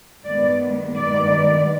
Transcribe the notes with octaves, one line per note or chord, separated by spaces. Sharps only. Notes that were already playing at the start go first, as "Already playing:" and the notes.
G2 D#3 G#3 B3 D5
G2 D#3 G#3 B3 D5